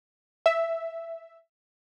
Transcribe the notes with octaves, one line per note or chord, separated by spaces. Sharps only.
E5